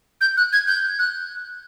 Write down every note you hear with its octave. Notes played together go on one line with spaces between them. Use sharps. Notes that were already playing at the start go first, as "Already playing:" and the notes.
G6
F#6
G#6
G6
F#6